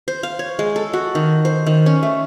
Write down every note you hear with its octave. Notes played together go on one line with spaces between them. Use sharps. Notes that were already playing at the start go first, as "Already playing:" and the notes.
C5
F5
C#5
G#3
A4
F#4
D#3
C5
D#3
C#4
A3